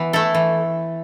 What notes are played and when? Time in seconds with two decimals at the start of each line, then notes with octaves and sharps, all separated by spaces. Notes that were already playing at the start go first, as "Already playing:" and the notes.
Already playing: E3 B3 E5
0.13 A3 E4 A4
0.34 E3